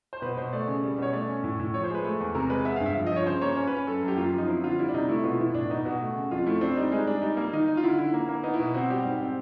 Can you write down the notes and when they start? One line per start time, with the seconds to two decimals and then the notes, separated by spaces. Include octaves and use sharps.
0.13 C5
0.22 B2 B4
0.37 B2 C5
0.53 A3 D5
0.68 C#3
0.83 G3
0.98 B2 C#5
1.13 A3 D5
1.29 C#4
1.44 A2
1.60 A2
1.74 F3 C#5
1.84 C5
1.90 G#3 B4
2.05 A3
2.21 E2
2.35 C3 A#4
2.50 G#3 B4
2.65 B3 E5
2.76 G2 F5
2.86 E5
2.97 F3
3.06 D#5
3.12 F3 C#5
3.26 C#3 C5
3.41 A#3 C#5
3.56 C#4 C#5
3.67 B4
3.73 C#4
3.87 F#2 A4
4.02 F#2
4.08 G4
4.17 A#3 F4
4.33 F3 D#4
4.48 C4 E4
4.63 D3 F4
4.78 G3 E4
4.88 D4
4.94 C3 D#4
5.09 A3 E4
5.24 B2 F4
5.39 E3 E4
5.54 A2 D4
5.70 B2 D#4
5.85 B2 F#4
6.01 A3
6.15 C#3
6.31 F2 F4
6.46 A3 E4
6.61 C4 D4
6.76 G3 D#4
6.92 G#3 D#4
7.06 G#3 D4
7.22 G3 D#4
7.37 A#3
7.53 D#3 D#4
7.67 D#3 D#4
7.77 F4
7.83 D3 E4
7.98 D3 E4
8.14 A#3
8.29 A#3
8.43 B3 D#4
8.54 E4
8.60 B2
8.74 C4 F#4
8.90 G3 G4
9.05 G#2
9.20 C4